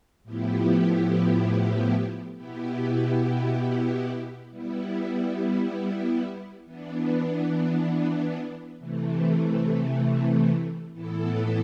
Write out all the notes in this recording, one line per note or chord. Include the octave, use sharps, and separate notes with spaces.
A2 F3 B3 E4 G4
B2 B3 E4 G4
G3 B3 E4
E3 B3 D4
C3 E3 A3
A2 E3 B3 E4 A4